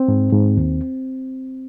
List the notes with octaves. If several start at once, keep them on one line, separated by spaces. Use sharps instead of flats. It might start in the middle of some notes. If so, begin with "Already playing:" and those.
Already playing: C4
G#2
G#2
D#2